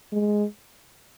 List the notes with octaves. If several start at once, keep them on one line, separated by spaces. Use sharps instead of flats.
G#3